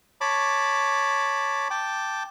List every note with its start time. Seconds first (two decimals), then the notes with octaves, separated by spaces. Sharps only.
0.21 C#5 A5 B5 D6
1.70 G5 A5 D6